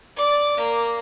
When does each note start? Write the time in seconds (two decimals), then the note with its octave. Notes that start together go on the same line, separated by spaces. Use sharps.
0.16 D5 D6
0.57 A#3